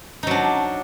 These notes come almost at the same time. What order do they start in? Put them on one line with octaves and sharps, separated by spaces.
D#4 F#3 D4